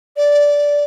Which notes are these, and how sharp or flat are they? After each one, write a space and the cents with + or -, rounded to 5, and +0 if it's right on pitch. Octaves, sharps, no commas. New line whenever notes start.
D5 -15